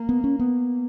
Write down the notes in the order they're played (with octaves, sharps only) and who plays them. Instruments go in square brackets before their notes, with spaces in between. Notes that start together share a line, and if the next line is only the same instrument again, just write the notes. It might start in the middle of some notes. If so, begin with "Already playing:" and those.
Already playing: [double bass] A#3
[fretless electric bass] B3
C#4
B3